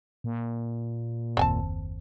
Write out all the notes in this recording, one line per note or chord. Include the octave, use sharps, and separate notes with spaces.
A#2
F#1 D#2 C4 G#5 A5